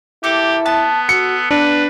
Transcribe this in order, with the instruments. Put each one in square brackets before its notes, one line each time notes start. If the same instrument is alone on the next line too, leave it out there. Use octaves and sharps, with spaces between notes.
[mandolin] A#3 A4 [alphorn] E4 [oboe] G4
[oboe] B3 [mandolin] A5
[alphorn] F#4 [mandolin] A4 [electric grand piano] C#7
[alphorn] B3 [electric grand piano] D4 [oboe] B4